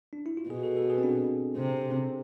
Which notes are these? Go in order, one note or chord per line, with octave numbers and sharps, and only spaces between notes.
D4
E4
F4
B2 G#4
A4
A4
G#4
C4
D4
C3